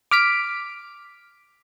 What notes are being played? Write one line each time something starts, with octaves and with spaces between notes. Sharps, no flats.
D6 F6 B6 D7